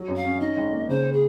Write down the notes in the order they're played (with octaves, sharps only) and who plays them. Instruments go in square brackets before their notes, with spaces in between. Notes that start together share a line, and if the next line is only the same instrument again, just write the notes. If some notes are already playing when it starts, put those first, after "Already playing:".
Already playing: [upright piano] F#3
F#2
[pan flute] F5
[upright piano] C#4
[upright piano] D#3 [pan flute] D#5
[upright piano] G#1
A#3
[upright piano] C#3 [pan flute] C5
[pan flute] G#4